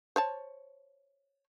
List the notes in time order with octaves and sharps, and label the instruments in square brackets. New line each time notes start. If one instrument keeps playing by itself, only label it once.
[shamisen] C5 C#5 A5